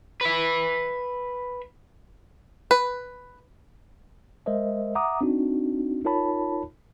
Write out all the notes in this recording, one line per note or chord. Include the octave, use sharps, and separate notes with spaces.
B4 E5
B4
G#3 A#4 C5 D#5 E5
E5 F#5 A#5 D6 D#6
C4 D4 D#4 F#4
D#4 F4 A#4 C#5 A5 B5